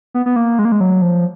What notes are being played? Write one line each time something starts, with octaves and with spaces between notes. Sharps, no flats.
B3
B3
A#3
G#3
A#3
G#3
F#3
F3